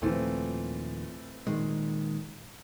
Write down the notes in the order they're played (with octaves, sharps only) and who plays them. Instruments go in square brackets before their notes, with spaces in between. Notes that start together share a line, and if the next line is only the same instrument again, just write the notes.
[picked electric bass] D#2 A#2 F3 [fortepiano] E3 A3 C4
[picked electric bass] A#2 D#3 G#3